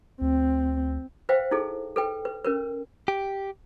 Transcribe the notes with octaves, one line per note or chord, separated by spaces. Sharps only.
D2 C4
B4 C5 E5 F5 G5
D#4 E4 G#4 A4
A4 B4 G5
B4
C#4 A#4 B4
G4